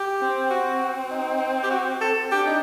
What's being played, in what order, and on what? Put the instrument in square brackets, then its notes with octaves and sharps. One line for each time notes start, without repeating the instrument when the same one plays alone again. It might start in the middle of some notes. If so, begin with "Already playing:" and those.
Already playing: [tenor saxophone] G4
[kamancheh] C4
[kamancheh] C4 [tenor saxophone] F#4
[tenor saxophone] D#4
G4
F#4
A4
[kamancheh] D4 [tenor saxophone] G4
[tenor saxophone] D#4